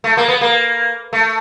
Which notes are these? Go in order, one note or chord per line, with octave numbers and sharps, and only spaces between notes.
A3
A#3
B3
A#3
A3